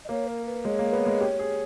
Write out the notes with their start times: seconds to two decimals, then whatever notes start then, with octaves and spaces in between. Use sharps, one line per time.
0.05 D#5
0.09 A#3 C#5
0.28 A#4
0.46 B4
0.65 G#3 C#5
0.79 A#3
0.93 B3
1.06 G#3
1.20 G4
1.39 G#4